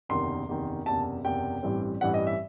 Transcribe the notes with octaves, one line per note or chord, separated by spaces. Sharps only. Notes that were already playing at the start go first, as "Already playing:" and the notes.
F#1 E2 C3 D#3 C6
F#1 E2 C3 D#3
F#1 E2 C3 A5
F#1 E2 C3 G5
A1 G2 E3 G3 C4
A1 G2 E3 G3 C4 F#5
D#5
E5